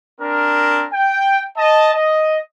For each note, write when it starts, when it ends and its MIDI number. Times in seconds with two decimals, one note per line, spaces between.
0.20 0.87 60
0.20 0.87 62
0.20 0.87 70
0.93 1.45 79
1.57 1.91 75
1.57 1.91 81
1.94 2.38 75